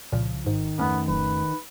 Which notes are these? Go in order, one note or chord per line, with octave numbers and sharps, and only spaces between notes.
C2 A#2 C#3 F3
G#1 G#2 D#3
F2 A3 B3 C#4
D1 B4